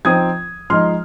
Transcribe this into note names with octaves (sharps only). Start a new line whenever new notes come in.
F3 C4 D#4 D#6 G#6
F3 G#3 D#4 C6 F6